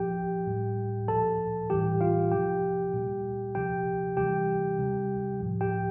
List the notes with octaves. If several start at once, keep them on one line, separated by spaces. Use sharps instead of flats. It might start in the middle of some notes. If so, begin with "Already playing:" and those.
Already playing: A#2 F3 G4 G5
A2 G3
A#2 F3 A4 A5
A2 E3 G3 G4 G5
F4 F5
C3 F3 G4 G5
A#2 G3
C3 F3 G4 G5
C3 E3 G3 G4 G5
C3 G3
A2 F3
G4 G5